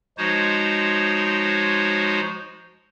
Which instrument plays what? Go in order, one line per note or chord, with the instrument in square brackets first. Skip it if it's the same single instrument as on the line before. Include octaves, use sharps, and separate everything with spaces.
[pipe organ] F3 G#3 D#4 F#4 C5 C#5